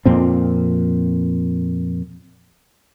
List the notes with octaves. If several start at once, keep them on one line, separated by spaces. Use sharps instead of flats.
F2 A#2 C4